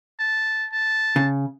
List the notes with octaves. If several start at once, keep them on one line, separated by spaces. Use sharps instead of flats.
A5
A5
C#3